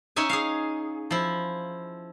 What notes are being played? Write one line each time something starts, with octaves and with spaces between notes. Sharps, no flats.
C#4 D#4 C#5 E5 G#5
G#4 F5
F3 E4